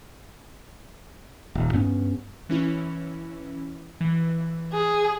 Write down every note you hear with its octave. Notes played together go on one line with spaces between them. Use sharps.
D#1
G2 B3 C#4
E3 C#4 E4
E3
G#4